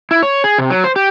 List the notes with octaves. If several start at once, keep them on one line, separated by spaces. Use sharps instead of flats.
E4
C#5
G#4
C3
F#3
C5
G4